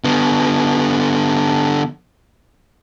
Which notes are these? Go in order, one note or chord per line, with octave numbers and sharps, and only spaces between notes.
D3 B3